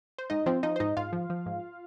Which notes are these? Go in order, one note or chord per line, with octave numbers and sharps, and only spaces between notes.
C5
G#2 D#4 D#5
F3 C4 C5
F3 D#4 D#5
C5
G#2 D#4 D#5
G#2 F4 F5
F3
F3
G#2